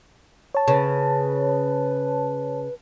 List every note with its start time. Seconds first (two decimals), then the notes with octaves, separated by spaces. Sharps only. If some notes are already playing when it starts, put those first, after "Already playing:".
0.55 C#5 A5
0.68 C#3 B4